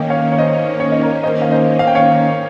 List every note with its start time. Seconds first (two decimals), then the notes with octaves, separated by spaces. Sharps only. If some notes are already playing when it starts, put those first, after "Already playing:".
Already playing: D#3 A#3 C#4 D#5 G5
0.10 C#5 F5
0.32 C#5
0.38 C5 D#5
0.80 C#5
0.92 D#5
1.02 A#4 C#5
1.23 C5 D#5
1.42 F5
1.51 C5 D#5
1.79 F5
1.87 G5
1.95 C#5 F5